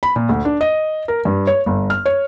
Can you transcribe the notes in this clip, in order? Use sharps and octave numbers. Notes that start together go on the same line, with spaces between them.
B5
A#2
D2
D4
D#5
A#4
G2
C#5
G1
F6
C#5